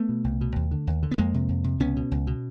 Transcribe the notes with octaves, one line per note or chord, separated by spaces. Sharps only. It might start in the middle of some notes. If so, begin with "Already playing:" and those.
Already playing: A3 B3
B2
C2
B2
D#2
D3
D#2
D3
B3
F2 G#3 A#3
C3
F2
C3
C#2 B3 C#4
B2
C#2
B2